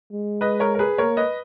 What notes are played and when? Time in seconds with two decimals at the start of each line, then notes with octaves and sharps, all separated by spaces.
0.12 G#3
0.41 B4 D#5
0.60 A#4 C#5
0.75 A#4
0.79 G#4 B4
0.98 A#3 A#4 C#5
1.17 B4 D#5